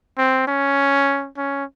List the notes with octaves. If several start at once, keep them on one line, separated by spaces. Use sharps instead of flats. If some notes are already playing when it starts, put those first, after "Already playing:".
C4
C#4
C#4